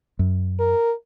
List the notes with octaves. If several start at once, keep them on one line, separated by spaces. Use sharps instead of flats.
F#2
A#4